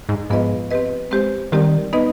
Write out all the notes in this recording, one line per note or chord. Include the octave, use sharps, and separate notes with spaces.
G#2
G#2 F3 B3 F4 B4 D#5
C4 G4 B4 D#5
G#3 C4 G4 C5
D#3 G3 C4 G4 D5
B3 D#4 B4 D#5